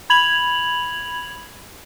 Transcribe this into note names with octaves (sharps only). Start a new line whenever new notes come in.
B5 G#6 F7 F#7